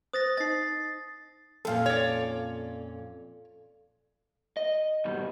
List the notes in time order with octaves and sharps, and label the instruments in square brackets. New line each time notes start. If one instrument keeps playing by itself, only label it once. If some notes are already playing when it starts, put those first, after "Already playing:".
[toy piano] C5 [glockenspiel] D#6 A6 A#6
[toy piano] D#4 D#5 [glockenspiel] A6 C7
[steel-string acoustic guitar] F2 A#2 C#4 [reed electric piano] A4 F5
[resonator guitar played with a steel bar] C#5 D5
[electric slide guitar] D#5
G#2 B2 D#3 G3